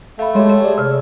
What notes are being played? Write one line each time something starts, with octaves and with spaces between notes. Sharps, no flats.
A3 F5 B5
G#3 G4 C#5 E5 C6
E5
G#4 D5
C3 F6